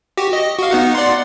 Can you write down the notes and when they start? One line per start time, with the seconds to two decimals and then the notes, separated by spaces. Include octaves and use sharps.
0.17 F#4 G4
0.33 D#5
0.59 F#4 F5
0.71 B3 D#4 F#5
0.95 D5 F#5 C6